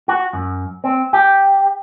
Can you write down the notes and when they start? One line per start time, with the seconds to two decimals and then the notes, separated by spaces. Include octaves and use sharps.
0.08 F#4
0.33 F#2
0.84 C4
1.13 G4